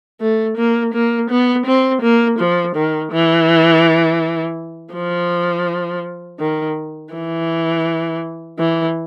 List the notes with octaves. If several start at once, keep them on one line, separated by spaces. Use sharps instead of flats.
A3
A#3
A#3
B3
C4
A#3
F3
D#3
E3
F3
D#3
E3
E3